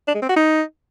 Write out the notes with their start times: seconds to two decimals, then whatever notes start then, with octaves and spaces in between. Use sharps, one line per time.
0.08 D4
0.15 G#3
0.22 C4
0.29 F#4
0.36 D#4